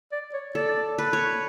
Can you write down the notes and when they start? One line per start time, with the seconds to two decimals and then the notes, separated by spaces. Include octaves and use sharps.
0.12 D5
0.34 C#5
0.55 A4 D5
0.98 B4
1.13 C#5